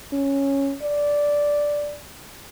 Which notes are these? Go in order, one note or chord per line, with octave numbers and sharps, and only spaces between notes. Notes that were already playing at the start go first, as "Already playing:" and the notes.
C#4
D5